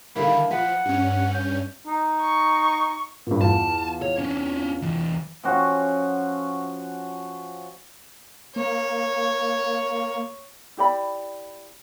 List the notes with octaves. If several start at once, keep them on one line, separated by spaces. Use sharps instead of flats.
D3 D#3 G3 A#3 D4 E4 B5
F3 B4 F#5
G2 C#4
G6
D#4
C#6
G2 A#2
E2 F4 A5
C#5
C#4 D4
E3 D4
F3 C#4 F#4
A#3 C#5
E4 G4 D5 B5